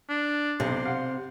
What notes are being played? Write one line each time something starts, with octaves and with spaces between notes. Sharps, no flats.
D4
B1 C3 C6
F5 F#5